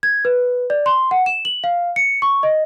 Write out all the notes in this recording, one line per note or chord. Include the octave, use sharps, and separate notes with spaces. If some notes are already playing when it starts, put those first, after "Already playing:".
G#6
B4
D5
C6
F#5
E7
F#7
F5
C#7
C#6
D#5